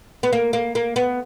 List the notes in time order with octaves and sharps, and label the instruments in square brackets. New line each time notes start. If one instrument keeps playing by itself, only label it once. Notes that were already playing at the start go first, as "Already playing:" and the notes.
[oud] B3
A#3
A#3
A#3
B3